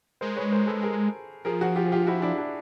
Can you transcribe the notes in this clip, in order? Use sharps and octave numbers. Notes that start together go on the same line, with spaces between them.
G#3 A#4 C5
B4 C#5
A#4 C5
A4 B4
G#4 A#4
F3 G#4 A#4
F#4 G#4
F4 G4
G#4
F4 G4
E4 F#4
D4 E4
D4 E4